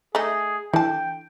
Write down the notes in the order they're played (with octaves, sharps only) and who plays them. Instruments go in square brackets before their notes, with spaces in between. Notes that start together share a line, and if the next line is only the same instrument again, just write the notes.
[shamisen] A3 D#4 [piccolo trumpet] G#4
[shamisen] D3 A5 [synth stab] E3 [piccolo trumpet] G5